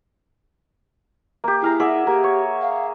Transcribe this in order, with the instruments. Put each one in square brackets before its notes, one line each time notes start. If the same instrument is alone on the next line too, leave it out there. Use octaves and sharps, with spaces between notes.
[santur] A#3 G4
[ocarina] E4 [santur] G#4 F5 A#5
[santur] G#4 D5 E5 [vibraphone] F#5
[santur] A#3 [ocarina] G4
[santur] C#5
[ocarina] F5